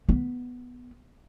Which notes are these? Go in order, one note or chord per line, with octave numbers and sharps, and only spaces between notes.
B3